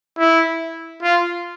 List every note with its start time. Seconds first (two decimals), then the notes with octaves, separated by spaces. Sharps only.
0.18 E4
1.02 F4